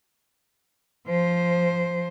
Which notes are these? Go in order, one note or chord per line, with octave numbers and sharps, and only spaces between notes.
F3 C5